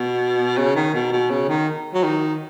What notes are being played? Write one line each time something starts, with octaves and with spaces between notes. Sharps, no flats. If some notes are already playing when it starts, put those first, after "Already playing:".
Already playing: B2
C#3
D#3
B2
B2
C#3
D#3
F#3
D#3